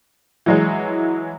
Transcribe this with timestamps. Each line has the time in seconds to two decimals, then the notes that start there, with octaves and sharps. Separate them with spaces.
0.46 E3 F#3 G#3